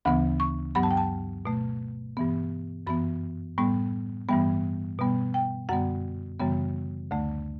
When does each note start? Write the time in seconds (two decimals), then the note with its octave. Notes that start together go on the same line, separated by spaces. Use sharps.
0.05 D2 C#3 E3 B3 B5
0.40 C#6
0.75 G2 F#3 B3 B5
0.83 A5
0.91 G5
0.97 A5
1.46 B2 A3
2.17 G2 E3 B3
2.87 F#2 E3 B3 B5
3.58 A2 G3 B3
4.29 G2 E3 G3 B3
4.99 B2 G3 B3
5.34 G5
5.69 F#2 D3 G3 B3 F#5
6.40 F#2 C#3 E3 G3 B3
7.11 D2 D3 A3